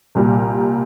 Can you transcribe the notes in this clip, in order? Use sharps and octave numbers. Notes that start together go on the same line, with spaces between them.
C2 A#2 G3